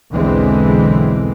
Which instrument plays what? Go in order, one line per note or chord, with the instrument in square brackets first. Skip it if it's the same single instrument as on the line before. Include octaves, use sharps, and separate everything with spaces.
[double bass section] B1 E2 D3 E3 G#3 C4